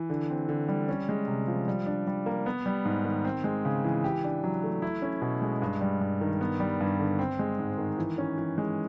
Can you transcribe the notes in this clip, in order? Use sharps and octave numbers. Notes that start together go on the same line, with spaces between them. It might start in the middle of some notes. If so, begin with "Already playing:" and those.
Already playing: E3
D3
C4
D3
G3
C#4
G#3
C3
F3
G3
D4
G3
A#3
B3
G3
G#2
D#3
C4
G#3
C#3
E3
G4
D4
F#3
A3
E4
C#4
B2
G#3
G2
G3
G2
D#3
B3
G3
G2
D3
C4
G#3
G#2
D#3
E3
C#4
E3
G#3